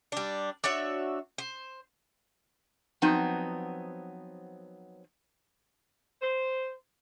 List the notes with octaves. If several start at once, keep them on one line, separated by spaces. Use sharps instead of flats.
G3 D4
D4 F#4 C#5 E5
C5
F3 F#3 B3 C4 D#4
C5